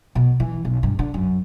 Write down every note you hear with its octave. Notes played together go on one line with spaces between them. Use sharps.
B2
E3
B1
G2
D3
F#2